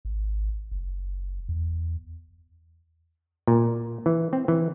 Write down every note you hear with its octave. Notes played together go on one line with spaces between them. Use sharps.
G#1
F#1
E2
A#2
E3
C4
E3